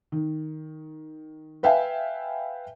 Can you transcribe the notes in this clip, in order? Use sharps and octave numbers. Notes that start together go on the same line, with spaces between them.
D#3
B4 E5 F5 G5 G#5